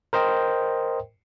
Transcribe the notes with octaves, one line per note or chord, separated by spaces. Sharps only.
A#4 C5 D#5 G5